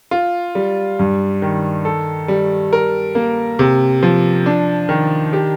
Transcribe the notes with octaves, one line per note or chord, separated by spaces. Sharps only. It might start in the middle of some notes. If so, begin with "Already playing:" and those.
F4
G3
G2
D#3
A4
G3
A#4
A#3
C3
F3
D4
D#3
G4